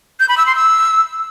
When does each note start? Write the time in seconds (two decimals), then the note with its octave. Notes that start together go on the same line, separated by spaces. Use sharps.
0.20 G6
0.29 B5
0.38 E6
0.46 C6
0.55 E6